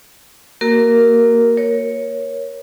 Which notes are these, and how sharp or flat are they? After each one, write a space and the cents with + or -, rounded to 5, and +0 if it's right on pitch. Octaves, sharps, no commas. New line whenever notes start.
A#3 -5 F#4 +25 A#4 +0
A#4 +20 C#5 +0